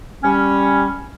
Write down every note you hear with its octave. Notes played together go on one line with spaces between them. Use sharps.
G3 C#4